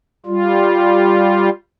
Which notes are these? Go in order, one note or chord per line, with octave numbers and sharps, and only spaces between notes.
G3 F4